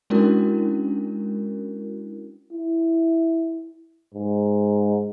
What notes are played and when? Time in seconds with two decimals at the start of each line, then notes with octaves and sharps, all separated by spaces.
0.10 G#3 C#4 D4 E4 F#4 A#4
2.52 E4
4.14 G#2